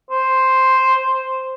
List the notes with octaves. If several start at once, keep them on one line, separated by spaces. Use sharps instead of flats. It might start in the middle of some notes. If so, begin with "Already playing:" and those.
C5